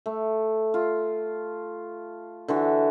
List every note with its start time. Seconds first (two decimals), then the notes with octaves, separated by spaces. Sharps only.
0.06 A3
0.74 F4
2.48 D3 E3 F#4